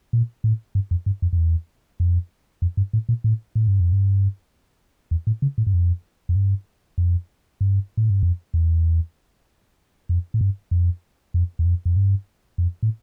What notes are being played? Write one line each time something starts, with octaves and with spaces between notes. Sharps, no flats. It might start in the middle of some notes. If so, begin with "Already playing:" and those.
A#2
A2
G2
F2
G2
F2
F2
E2
F2
F2
G2
A2
A#2
A2
A2
G2
F2
G2
E2
A2
C#3
A2
G2
F2
F2
G2
F2
G2
A2
G2
F2
E2
F2
A2
G2
F2
F2
E2
F2
F2
G2
F2
A2